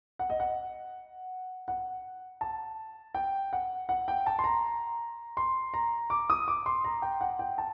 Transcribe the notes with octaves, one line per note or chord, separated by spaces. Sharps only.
F#5
D#5
F#5
F#5
A5
G5
F#5
F#5
G5
A5
C6
A#5
C6
A#5
D6
D#6
D6
C6
A#5
G5
F#5
G5
A5